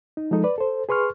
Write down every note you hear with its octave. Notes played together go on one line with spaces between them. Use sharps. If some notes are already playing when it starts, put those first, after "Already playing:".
D#4
F3 G#3 D#4 A4
B4 D5
A4 C5
G#4 B4 C6 C#6 F6